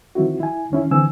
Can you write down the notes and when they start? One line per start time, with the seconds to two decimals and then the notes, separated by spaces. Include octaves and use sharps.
0.15 D#3 F3 C4 E4 F#4
0.40 E4 G#5
0.70 E2 D#3 C#4 E4
0.91 D3 E3 C4 G#5 E6